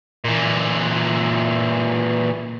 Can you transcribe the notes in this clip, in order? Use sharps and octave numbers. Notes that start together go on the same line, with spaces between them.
A#2 E3